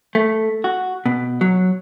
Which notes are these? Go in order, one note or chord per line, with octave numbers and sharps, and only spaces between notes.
A3
F#4
B2
F#3